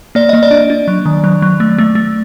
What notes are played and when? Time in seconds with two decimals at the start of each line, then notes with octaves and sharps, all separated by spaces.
0.15 A#3 D5
0.29 A#3 D#5
0.43 D5
0.51 D4
0.70 D4
0.88 F#3
1.06 D#3
1.24 F#3
1.42 F#3
1.60 A3
1.78 A3
1.95 A3